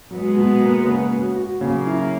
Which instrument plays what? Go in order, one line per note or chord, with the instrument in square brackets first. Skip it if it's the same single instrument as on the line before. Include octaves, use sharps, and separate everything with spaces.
[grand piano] F#3 [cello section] G#3 B3
[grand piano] B2
A#3
C#3
F#4
F#4
[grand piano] C#3 [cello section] F#3 A#3
[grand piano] E4